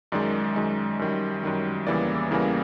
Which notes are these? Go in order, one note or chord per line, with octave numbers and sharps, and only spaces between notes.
F#2 D#3 G#3 D5
F#2 D#3 G#3
F#2 D#3 G3
F#2 D#3 G3
E2 C#3 E3 G3 A#3 D5
E2 C#3 E3 G3 A#3